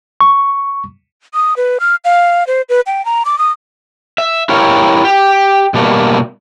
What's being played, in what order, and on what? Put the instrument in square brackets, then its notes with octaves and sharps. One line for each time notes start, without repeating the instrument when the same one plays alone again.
[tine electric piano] C#6
[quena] D#6
B4
F6
F5
C5
B4
G5
A#5
D6
D#6
[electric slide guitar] E5
E4 G4 A#4 C#5 F5
G4
B2 G3 A3 A#3